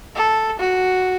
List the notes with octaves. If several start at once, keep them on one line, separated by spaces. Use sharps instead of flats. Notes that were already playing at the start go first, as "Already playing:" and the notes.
A4
F#4